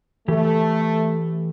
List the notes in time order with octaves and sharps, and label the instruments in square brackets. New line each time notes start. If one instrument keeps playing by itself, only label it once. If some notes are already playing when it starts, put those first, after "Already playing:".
[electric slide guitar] E3 G4 [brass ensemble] A3